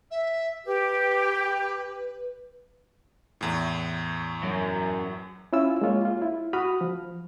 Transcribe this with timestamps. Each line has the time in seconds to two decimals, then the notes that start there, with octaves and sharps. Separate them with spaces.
0.10 E5
0.65 G4 B4
3.41 E2 A2
4.43 F#2
5.53 C#4 E4 F4 E6
5.81 G#3 A#3 F4 C#5
6.05 F4
6.22 E4
6.53 F#4 B5 D#6 F6
6.81 F3